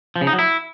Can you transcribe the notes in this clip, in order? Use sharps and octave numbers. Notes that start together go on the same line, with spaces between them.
F3
C#3
D#4
F#3
E4